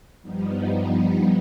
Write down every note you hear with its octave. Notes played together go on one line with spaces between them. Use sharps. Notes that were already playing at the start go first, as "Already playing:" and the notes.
G2 F3 G3 B3 D#4